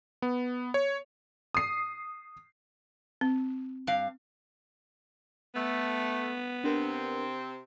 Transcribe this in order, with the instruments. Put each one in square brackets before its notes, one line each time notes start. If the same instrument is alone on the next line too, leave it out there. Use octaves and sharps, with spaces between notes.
[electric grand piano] B3
C#5
[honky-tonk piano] D#6 C7
[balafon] C4
[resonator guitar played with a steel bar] G2 F5
[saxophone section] A3 [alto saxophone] B3
[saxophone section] C3 C4 [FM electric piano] D4 A#4